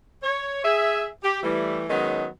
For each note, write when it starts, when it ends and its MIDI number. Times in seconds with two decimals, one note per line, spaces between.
0.23 0.62 73
0.64 1.07 68
0.64 1.07 76
1.23 1.42 67
1.43 1.85 52
1.43 1.85 55
1.43 1.85 57
1.90 2.26 51
1.90 2.26 54
1.90 2.26 56
1.90 2.26 59
1.90 2.26 61
1.90 2.26 63